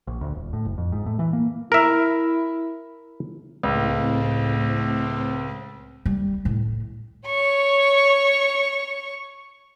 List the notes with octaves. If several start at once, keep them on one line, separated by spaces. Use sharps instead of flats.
A#1
D2
D#1
A2
F#1
F2
G#2
A2
E3
A#3
E4 A#4 E5
C#2 A2 C4
G3
A2
C#5 C#6